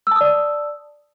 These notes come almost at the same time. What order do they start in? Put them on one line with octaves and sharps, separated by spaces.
E6 A5 D#6 D5